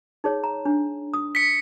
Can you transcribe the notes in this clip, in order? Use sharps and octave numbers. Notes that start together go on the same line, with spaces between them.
D#4 G#4 C#5
A#5
D4
D#6
B6 C#7